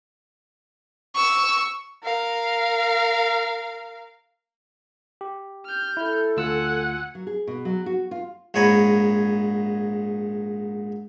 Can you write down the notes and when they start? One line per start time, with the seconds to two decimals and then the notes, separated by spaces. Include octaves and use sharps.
1.15 C#6 E6
2.03 A#4 F5
5.21 G4
5.65 F6 G6
5.97 E4 A4
6.37 D2 F4 F#5 G#5 E6
7.15 F#3
7.27 G#4
7.47 B2
7.65 F#3
7.86 F#4
8.11 F4
8.54 A#1 G#2 C#5 G#5 A#5 B5